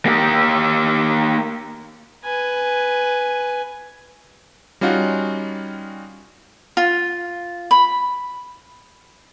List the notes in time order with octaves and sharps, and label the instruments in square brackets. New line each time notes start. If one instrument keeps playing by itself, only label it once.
[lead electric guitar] A#3 G4
[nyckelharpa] B4 G#5
[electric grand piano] G3 C#4 D#4 F4 F#4
[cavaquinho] F4
B5